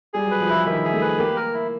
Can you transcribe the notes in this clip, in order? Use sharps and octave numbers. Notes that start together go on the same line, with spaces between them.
G3 G#4
F#3 B4
F3
E3 E4
D#3 E5
G#4
A3
B4
A#3 G4
A#4
E4